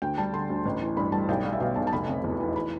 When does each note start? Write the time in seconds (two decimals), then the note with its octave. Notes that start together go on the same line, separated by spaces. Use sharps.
0.02 D2 G5
0.18 G3 A5
0.33 D3 C6
0.50 D2
0.65 A1
0.81 E3
0.97 G2 B5
1.12 G3 A5
1.29 B1 G5
1.44 G3 F5
1.53 E5
1.60 B2 F5
1.76 B1 A5
1.87 A5
1.93 F1 B5
2.08 C3
2.24 E2
2.40 E3
2.56 B5